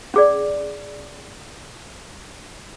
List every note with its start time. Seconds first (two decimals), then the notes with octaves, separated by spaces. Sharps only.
0.14 C#4 G#4 D5